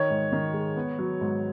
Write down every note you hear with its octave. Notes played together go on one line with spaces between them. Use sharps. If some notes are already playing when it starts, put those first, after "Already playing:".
Already playing: D#3 C#5
G#2
D#3
G#3
B3
F#3
G#2